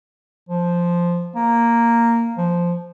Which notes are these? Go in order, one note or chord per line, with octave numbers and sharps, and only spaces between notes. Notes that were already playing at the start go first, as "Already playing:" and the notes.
F3
A#3
F3